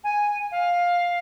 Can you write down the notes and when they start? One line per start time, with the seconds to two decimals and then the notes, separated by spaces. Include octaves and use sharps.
0.04 G#5
0.51 F5